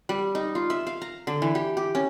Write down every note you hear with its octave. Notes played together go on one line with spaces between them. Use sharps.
G3
D#4
F4
E5
F5
A#5
D3
E3
G4
G4
C#4